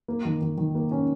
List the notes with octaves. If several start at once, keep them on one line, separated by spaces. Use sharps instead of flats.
A#3
D#3
D#3
D#3
A#3
C#4